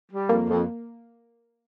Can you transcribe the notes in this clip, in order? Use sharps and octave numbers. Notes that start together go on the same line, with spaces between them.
G3
F2 A#3
F2